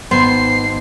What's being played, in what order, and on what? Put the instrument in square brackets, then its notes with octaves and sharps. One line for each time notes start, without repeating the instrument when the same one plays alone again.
[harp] G#1 B4 [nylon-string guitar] B3 [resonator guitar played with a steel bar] C5 [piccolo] C7